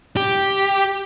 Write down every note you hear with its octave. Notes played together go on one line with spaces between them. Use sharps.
G4